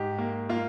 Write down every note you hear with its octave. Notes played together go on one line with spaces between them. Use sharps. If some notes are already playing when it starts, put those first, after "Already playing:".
Already playing: G#2 G4
A#3
A#3 F4